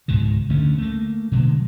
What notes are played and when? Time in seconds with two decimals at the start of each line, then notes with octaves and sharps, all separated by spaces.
0.08 C#2 G#2 B2 D#3
0.49 D2 D3 A3 C#4
0.78 A3 A#3
1.32 B2 D3 F#3 G#3